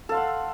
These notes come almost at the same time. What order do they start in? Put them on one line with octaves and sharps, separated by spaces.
A4 F5 C6 F#5